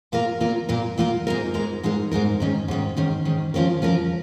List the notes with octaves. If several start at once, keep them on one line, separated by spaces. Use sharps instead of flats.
A#2 A#3 F4 A#4
A#2 A#3 F4 A#4
A#2 A#3 F4 A#4
A#2 A#3 F4 A#4
G#2 G#3 D#4 A#4
G#2 G#3 D#4 A#4
G#2 G#3 D#4 A#4
G#2 G#3 D#4 A#4
G#2 D#3 C#4
G#2 D#3 C#4
G#2 D#3 C#4
G#2 D#3 C#4
F3 C#4 F4 A#4
F3 C#4 F4 A#4